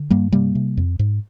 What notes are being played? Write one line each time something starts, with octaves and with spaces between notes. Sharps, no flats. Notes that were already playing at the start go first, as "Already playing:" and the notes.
Already playing: D3
G2 G3 A#3
C3 G3 A#3
C3
F2
G#2